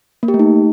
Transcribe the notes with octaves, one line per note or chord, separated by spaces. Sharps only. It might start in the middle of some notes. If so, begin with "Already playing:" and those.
A#3
G4
A3
D#4